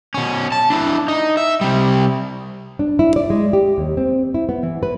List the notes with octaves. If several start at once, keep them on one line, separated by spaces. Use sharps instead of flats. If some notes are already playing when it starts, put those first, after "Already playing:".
B2 C#4
A5
D4 E4
D#4
E5
C3 G3
D4
E4
D5
G#3
G4
D#2
C4
E4
B3
E3
B4